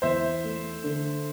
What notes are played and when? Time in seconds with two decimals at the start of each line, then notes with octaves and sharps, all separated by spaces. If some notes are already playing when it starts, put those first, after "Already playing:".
0.02 E2 C5 E5
0.43 A3
0.84 D3